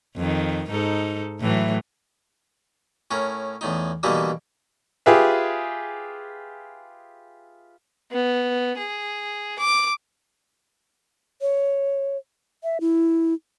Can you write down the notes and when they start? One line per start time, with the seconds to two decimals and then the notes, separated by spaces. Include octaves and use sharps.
0.16 F2 D#3
0.70 G#2 D#4 A4
1.41 A2 E3 F#3
3.11 A2 C#4 A#4
3.61 E2 A2 D#4
4.03 B2 D3 E3 G3 A#3 D#4
5.06 F4 G4 G#4 B4 E5
8.11 B3
8.77 G#4
9.59 D6
11.41 C#5
12.64 E5
12.81 E4